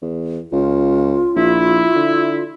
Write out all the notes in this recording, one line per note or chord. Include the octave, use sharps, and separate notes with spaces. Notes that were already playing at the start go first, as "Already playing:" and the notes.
E2
C#2 F4
A#1 E4
D3